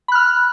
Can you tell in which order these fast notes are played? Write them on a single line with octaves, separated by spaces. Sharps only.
B5 F#6 F6